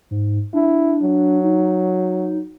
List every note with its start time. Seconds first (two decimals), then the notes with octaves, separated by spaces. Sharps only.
0.11 G#2
0.54 D4 E4
1.02 F#3
1.44 D#4